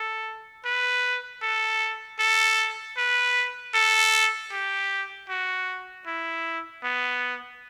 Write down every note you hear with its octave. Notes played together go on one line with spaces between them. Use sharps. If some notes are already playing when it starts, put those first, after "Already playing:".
Already playing: A4
B4
A4
A4
B4
A4
G4
F#4
E4
B3